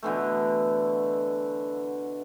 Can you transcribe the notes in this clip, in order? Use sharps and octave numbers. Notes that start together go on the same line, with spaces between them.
B2 D3 E3 A3